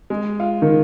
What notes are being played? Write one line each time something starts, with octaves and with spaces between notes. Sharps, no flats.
G#3
F4
D#3